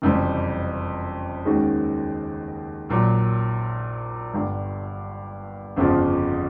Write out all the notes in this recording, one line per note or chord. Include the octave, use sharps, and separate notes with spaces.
F#1 F2 C3 E3 G3
D#2 D#3 G#3 C#4 F#4
A#1 A#2 F#3
G1 G2 D3
G1 F2 C#3 F3